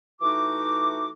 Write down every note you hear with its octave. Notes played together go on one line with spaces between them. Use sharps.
E3 A3 D#4 F#4 D6